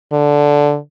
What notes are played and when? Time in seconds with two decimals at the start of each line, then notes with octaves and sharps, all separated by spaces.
0.13 D3